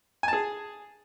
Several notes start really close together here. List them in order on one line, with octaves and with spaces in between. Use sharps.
G#5 A5 G#4